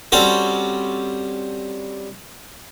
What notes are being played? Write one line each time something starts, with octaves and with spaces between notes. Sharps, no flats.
G3 C4 C#4 F#4 A4